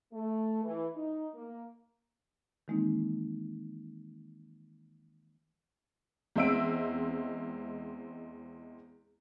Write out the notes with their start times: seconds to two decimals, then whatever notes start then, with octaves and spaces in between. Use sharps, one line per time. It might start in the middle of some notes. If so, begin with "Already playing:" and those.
0.13 A3
0.63 E3
0.95 D#4
1.34 A#3
2.68 D#3 E3 G#3 A#3 C4 D#4
6.36 E2 G#3 C4 E5 E6 D7